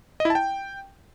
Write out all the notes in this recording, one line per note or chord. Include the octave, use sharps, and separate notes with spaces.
D#5
E4
A5
G5